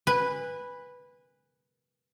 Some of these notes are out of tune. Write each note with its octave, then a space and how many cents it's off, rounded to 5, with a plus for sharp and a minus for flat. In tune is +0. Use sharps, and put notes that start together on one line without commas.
B4 +0 G#5 -30